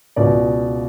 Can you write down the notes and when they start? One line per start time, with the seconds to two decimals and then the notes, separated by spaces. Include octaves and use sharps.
0.16 C#2 B2 G#3 D5